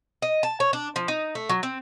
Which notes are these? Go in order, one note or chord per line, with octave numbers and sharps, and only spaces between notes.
D#5
A5
C#5
D4
F3
D#4
A3
F#3
C4